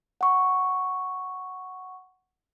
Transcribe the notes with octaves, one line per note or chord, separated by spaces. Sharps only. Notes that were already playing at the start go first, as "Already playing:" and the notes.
F#5 C#6